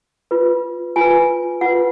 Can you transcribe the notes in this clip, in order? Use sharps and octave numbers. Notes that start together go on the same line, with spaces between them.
F4 B4
F4 B4 G#5
F4 B4 F#5